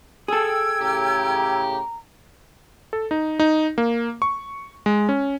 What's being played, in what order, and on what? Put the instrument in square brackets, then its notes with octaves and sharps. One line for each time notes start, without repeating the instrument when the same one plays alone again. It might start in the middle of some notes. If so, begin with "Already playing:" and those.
[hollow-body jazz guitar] G#4 A4 [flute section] G5 E6 G#6
[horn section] A2 C#3 G4 [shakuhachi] A#5
[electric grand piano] A4
D#4
D#4
A#3
C#6
G#3
C#4